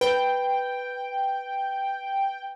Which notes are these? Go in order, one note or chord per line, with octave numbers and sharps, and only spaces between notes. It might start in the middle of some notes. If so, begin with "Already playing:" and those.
B4 G5